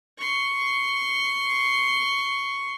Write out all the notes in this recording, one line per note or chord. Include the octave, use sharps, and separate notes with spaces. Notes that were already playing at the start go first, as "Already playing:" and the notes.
C6 C#6